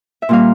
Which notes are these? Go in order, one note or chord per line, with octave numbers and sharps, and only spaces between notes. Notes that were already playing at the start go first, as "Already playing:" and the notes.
E5
A#2 G3 A#3 F5